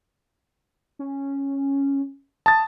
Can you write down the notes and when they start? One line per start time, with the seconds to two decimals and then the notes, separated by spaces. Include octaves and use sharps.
0.99 C#4
2.46 A5 D#6 A6